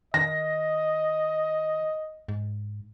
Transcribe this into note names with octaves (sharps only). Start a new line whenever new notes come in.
D#3 D#5 A#6
G#2